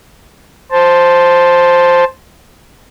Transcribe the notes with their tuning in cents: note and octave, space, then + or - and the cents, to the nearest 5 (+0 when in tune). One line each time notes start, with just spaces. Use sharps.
C5 +0 A5 +0